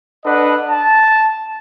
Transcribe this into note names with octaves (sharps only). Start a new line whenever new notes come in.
D4 A4 B4 D#5 F#5
A5